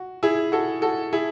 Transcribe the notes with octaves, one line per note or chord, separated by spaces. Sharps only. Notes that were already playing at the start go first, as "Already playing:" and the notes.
Already playing: F#4
E4 G#4
F#4 A4
F#4 A4
E4 G#4